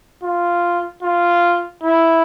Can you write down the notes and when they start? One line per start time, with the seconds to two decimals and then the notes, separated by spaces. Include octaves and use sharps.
0.23 F4
1.03 F4
1.84 E4